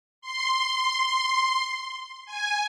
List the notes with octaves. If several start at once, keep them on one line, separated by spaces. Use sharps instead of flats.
C6
G#5